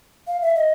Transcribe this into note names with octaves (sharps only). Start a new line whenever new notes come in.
F5
E5
D#5